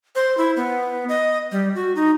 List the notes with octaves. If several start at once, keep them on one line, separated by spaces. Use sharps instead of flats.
C5
E4
B3
D#5
G3
F#4
D#4